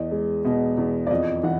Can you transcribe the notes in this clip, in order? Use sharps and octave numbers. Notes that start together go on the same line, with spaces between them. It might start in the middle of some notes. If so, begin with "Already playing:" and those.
Already playing: E2 D#5
G#3
B2 D#5
E2
D5
F2 D#5
E3 F#5